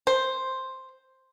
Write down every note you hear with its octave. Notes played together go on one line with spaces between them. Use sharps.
C5